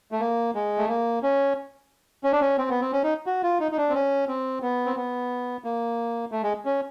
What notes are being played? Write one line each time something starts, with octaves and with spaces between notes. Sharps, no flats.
A3
A#3
G#3
A3
A#3
C#4
C#4
D4
C#4
C4
B3
C4
C#4
D#4
F#4
F4
D#4
D#4
D4
C4
C#4
C4
B3
C4
B3
A#3
A3
G#3
C#4